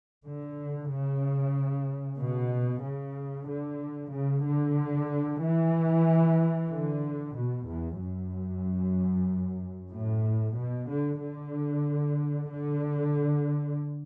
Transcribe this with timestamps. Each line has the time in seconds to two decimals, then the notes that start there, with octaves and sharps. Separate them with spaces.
0.25 D3
0.90 C#3
2.19 B2
2.83 C#3
3.48 D3
4.12 C#3
4.45 D3
5.42 E3
6.71 D3
7.35 B2
7.67 E2
7.99 F#2
9.92 A2
10.57 B2
10.90 D3
11.21 D3
12.51 D3